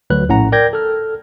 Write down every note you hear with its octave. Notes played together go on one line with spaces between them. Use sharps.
D2 F#3 B4 F#6
A#1 A2 C#4 F#5 A#5
A#4 D5 G5 G6 G#6 A#6
A4 F6